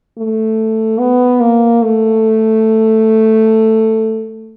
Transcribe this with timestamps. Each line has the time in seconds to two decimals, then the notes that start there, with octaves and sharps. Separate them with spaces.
0.18 A3
1.00 B3
1.41 A#3
1.83 A3